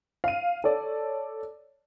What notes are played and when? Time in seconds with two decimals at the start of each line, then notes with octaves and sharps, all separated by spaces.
0.24 F5 D#7
0.64 A4 C#5 D5